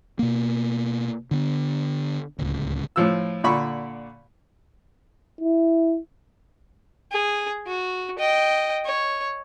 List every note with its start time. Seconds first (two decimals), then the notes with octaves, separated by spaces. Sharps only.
0.19 B2 A#3
1.31 D3 B3
2.38 D1 C#2
2.96 A2 F3 E6
3.44 A#2 D3 B5 C#6
5.40 E4
7.12 G#4
7.67 F#4
8.18 D#5 G5
8.85 C#5